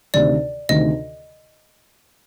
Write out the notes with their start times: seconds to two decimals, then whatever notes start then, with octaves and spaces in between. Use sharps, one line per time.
0.14 D2 C3 D#3 D5
0.69 D2 C3 D#3 D#5